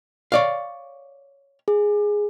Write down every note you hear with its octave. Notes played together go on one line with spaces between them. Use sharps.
C#5 D5 F5
G#4